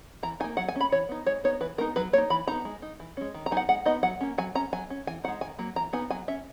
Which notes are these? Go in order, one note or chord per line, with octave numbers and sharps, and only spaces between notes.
E3 A#5
A#3 D#4 G#5
F#3 F#5
G#5
A#3 C#4
B5
E3 C#5
B3 D#4
G#3 C#5
B3 D#4 C#5
E3 B4
G#3 B3 D#4 A#4
F#3 B4
A#3 D#4 C#5
E3 B5
B3 D#4 A#5
G#3
D#4
E3
G#3 C#4
D#3
A#5
F#3 B3 D#4 G#5
F#5
G#3 F#5
B3 D#4 D#5
F#3 F#5
A#3 C#4
F#3 G#5
C#4 A#5
F#3 G#5
C#4
E3 G#5
G#3 D#4 F#5
D#3 G#5
F#3 A#3
E3 A#5
B3 D#4 G#5
F#3 G#5
C#4 E5